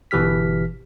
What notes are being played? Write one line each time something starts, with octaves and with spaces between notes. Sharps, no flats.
G1 B2 E3 G4 F6 B6